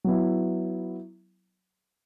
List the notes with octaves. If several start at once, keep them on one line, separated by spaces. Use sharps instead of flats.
F#3 B3 E4